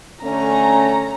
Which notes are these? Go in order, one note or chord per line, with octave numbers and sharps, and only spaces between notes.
D3 A3 C#4 A#5